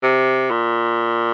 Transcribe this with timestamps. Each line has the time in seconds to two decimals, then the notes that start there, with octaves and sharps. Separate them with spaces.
0.03 C3
0.50 A#2